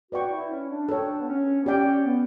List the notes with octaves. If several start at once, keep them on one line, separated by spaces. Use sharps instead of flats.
F#4 B4 D5 G5 C#6
E4
C#4
D4
D4 A4 C#5 G5
B3
C#4
B3
C#4 G4 D5 G5
B3